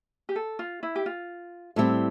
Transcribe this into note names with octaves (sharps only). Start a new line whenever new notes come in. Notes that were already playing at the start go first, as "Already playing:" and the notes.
G4
A4
F4
E4
G4
F4
A2 G3 C4 E4